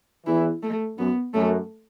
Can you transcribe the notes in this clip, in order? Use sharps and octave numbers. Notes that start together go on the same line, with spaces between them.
E2 E3 E4
A3
F#2 B3
F#2 A3